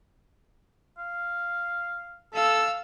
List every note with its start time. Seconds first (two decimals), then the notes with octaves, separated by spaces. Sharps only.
0.98 F5
2.34 A4 F5 E6